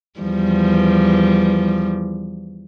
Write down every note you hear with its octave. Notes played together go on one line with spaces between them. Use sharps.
E2 F3 G3